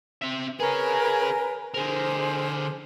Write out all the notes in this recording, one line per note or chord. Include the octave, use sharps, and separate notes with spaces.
C4 E5
G#4 A#4 B4 C#5 G#5
D3 G#4 A#4 C5